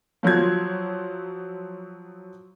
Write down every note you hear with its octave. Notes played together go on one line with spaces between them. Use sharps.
F3 F#3 C6 G#6